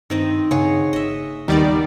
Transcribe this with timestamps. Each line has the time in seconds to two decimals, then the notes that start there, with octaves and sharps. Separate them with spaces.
0.10 G2 D#3 C4 D#5
0.51 G2 C#3 G#4 C#5 F#5
0.93 F#1 D#5 E5
1.48 D#2 D#3 G3 B3 D#4 D5